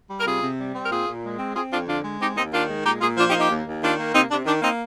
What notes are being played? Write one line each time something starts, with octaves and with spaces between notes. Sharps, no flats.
G3
A#4
C3 F4 G#4
C3
G3
C4
A#4
A#2 F4 G#4
A#2
G#3
C4
C4 F4 G#4
F2 D4 F4
D3 D4 F4
G#3
C4 D#4 G4
D#2 C4 D#4
D#3 D4 F4
G#3
A#2 D#4 G4
A#2 F4 G#4
F3 D4 F4
D#4 G4
A#3
D#4 G4
D#2
D#2
D#3 D4 F4
A#3
C3 C4 D#4
C3 D4
D#3 D4
A#3 C4 D#4